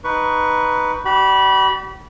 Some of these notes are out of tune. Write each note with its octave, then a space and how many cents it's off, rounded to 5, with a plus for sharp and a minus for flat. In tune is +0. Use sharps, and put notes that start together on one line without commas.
D#4 +0 B4 +0 C#6 +15
G4 -45 D5 +0 B5 -20